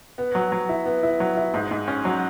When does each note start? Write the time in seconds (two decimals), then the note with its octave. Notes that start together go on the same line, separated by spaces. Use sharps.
0.18 B3
0.35 F#3
0.52 F#3
0.69 E4
0.85 B3
1.03 E4
1.20 F#3
1.37 E4
1.54 G#2
1.71 G#2
1.88 C#4
2.05 F#3